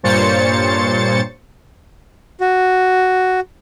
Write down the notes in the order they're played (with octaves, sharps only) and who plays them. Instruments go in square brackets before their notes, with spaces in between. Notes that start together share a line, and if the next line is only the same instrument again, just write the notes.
[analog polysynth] G2 A#2 C5 C#5 A6 C#7
[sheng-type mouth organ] F#4